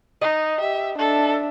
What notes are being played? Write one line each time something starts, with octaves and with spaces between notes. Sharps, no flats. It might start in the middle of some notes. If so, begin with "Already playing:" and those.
D#4 D#5
G4 E5
D4 A4 E5